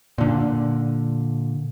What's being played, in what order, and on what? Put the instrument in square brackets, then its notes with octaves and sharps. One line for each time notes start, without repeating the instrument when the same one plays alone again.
[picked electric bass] A#2 D3